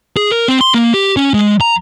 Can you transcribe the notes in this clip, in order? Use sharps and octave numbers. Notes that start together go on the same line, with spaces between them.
G#4
A#4
C4
C6
A#3
G4
C#4
G#3
A#5